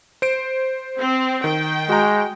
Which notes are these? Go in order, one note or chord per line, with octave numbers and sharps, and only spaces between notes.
C5 D7
C4
D#3 G5
G#3 F#4 A#5